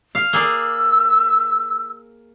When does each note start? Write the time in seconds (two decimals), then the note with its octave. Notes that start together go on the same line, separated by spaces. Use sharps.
0.15 F5
0.33 A#3 G#4 D5 E6